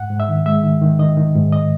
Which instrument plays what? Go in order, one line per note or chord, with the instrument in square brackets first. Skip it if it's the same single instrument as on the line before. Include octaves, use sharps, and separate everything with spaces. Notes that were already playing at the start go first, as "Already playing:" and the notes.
Already playing: [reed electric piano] G#2 F#5
G#2
E5
D#3
G#3 E5
D#3
D#3
D#3 D#5
D#3
G#2
D#5